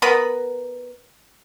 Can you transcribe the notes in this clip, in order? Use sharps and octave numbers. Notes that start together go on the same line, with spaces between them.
B3 A#4 B4 B5